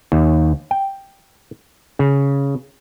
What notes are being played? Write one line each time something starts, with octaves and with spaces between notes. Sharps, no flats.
D#2
G5
C#3